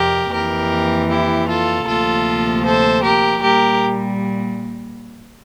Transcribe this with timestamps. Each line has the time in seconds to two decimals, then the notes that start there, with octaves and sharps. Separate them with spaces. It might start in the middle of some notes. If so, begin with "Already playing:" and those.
Already playing: F2 C3 F3 G4 A#4
0.33 F2 E3 A#3 G4 A#4
1.09 E4 G4
1.48 F4 A4
1.87 D2 C3 F3 A#3 F4 A4
2.64 A4 C5
3.03 G4 A#4
3.42 A#2 G3 A#3 G4 A#4